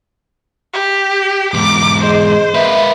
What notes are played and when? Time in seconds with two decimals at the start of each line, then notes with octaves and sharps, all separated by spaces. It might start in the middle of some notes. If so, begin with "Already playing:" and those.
0.73 G4
1.54 E2 G#2 D6
2.03 G#4 C5 D#5
2.55 A#3 B4 E5